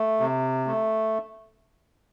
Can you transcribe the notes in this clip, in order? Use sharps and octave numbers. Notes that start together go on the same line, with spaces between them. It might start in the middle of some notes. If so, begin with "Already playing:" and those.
Already playing: A3
C3
A3